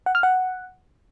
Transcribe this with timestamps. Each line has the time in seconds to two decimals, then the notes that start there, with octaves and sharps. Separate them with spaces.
0.06 F#5
0.15 F6
0.23 F#5